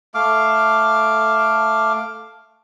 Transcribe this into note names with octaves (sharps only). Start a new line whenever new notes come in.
A3 F5 D6